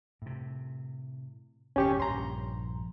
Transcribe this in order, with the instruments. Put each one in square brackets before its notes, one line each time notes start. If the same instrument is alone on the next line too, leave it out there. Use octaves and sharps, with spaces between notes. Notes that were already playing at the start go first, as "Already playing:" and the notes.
[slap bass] A2 C3
[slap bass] G#1 F2 A#2 [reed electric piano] C#4 G4 C#6
[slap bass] A#1 G2 [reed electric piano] A#5 C6